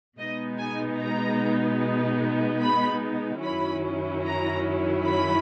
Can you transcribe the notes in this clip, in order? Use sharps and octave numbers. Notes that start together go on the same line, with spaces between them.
B2 G#3 B3 D#4 D#5
G#5
A#5
B5
F#2 D#3 F#3 C#4 E4 B5
A#5
B5